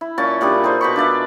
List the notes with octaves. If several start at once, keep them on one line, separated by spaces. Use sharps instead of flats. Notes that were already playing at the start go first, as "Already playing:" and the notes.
E4
A#2 C#4 A5
A#2 G3 D4 G#4
D#4 G#4 A4 C5
B2 B5 C#6
D4 F4 D5 E5